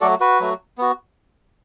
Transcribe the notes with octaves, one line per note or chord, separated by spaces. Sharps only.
F#3 A3 F#4 A4 D5
F#4 B4
F#3 A3 F#4
B3 F#4